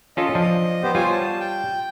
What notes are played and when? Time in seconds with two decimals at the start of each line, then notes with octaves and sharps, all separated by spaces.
0.17 C#4 F4 A4 D#5
0.35 F3 D4
0.83 B3 G4 C5
0.95 G3 F4 C5 C#5 G#5
1.12 A5
1.40 G5